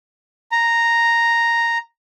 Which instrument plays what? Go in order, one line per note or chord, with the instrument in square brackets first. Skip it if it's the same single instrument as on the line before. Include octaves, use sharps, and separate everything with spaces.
[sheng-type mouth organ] A#5